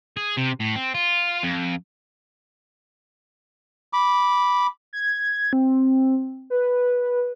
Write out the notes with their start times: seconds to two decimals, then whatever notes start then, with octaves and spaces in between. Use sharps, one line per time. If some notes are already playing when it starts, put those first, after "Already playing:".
0.17 G#4
0.37 C3
0.60 A2
0.76 C4
0.94 F4
1.43 F2
3.93 B5 D6
4.93 G#6
5.53 C4
6.50 B4